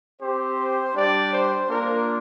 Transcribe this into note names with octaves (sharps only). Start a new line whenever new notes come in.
C4 G4 C5
G3 D4 G4 D5
C5
A#3 D4 F4 A#4